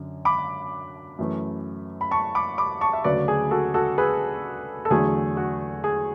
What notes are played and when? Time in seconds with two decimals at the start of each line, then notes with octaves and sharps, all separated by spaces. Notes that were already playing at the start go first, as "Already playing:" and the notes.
Already playing: F#2 D3
0.25 B5 D6
1.19 F#2 E3 A3
2.01 B5
2.11 A5 C#6
2.35 B5 D6
2.58 B5 D6
2.81 A5 C#6
2.93 E5
3.04 D2 C#3 F#3 A3 B4 D5
3.28 G#4
3.51 F#4 A4
3.74 F#4 A4
3.98 G#4 B4
4.85 A4
4.90 E2 D3 F#3 A3 G#4
5.37 F#4
5.84 G#4